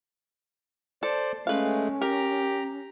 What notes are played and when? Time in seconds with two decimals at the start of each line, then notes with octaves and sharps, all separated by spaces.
1.03 A4 C5 D5
1.47 G#3 A3 C#4 B4 F5
2.02 G4 A#4 A#5